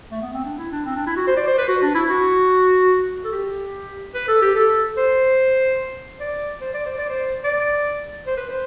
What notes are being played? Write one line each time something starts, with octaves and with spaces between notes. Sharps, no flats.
A3
B3
C4
D4
E4
D4
C4
D4
E4
F#4
C5
D5
C5
B4
F#4
D4
E4
F#4
A4
G4
B4
A4
G4
A4
C5
D5
C5
D5
C5
D5
C5
D5
C5
B4
C5